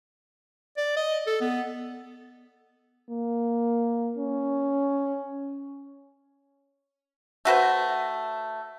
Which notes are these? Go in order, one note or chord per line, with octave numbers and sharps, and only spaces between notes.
D5
D#5
A4
B3
A#3
C#4
A3 F#4 B4 C5